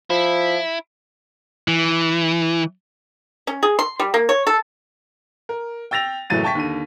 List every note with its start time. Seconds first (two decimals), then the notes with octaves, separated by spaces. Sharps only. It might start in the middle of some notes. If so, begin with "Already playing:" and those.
0.10 F3 E4
1.68 E3
3.47 C#4
3.63 G#4
3.79 C6
3.99 G3
4.14 A#3
4.29 C#5
4.47 A4
5.49 A#4
5.91 G5 E6 A6 A#6 F7
6.30 F#1 A2 E3 F#3 A6 D#7
6.43 G5 A5 C#6 A6 B6
6.55 D#2 D3 D#7